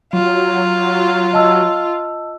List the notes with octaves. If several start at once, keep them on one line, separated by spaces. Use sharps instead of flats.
F#3 F4
D#5 A5 E6